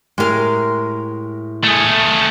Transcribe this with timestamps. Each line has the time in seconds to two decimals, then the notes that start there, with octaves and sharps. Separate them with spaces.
0.18 A2 G#3 G4 A#4
1.64 A3 G#4